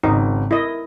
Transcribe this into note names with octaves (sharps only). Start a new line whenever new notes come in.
G#1 C#3 D#4
E4 A#4 D#5